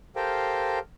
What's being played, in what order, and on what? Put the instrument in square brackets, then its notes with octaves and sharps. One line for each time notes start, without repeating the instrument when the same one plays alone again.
[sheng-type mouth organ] G4 A4 A#4 C5 F5 G5